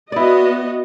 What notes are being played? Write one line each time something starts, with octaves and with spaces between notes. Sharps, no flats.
B3 E4 F#4 D5 D#5